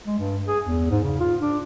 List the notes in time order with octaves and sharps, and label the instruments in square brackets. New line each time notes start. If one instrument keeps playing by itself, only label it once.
[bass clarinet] G#3
G2
G#4
E2
G#2
C#3
F4
D4